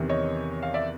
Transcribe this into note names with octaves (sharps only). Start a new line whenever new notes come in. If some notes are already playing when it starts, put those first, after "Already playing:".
Already playing: E2 C3 D#3
C#5 D#5
F5
D5 E5